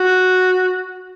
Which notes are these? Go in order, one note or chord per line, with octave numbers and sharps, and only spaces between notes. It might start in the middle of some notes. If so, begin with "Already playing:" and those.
Already playing: F#4